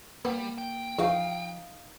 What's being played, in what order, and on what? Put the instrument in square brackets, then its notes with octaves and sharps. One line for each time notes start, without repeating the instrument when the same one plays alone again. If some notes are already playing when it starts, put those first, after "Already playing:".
[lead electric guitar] G3 [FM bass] A#3 [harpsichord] B3
[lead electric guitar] G5
[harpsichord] E2 F#4 [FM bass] F3 [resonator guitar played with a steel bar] D#4 F5